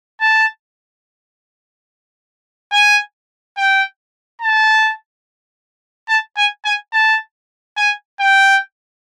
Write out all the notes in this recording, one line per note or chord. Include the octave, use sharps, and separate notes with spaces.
A5
G#5
G5
A5
A5
G#5
G#5
A5
G#5
G5